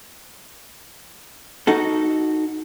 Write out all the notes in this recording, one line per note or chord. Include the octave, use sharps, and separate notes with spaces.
D#4 F#4 A4